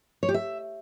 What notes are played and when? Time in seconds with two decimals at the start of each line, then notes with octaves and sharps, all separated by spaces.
0.23 C#5
0.29 G4
0.34 E5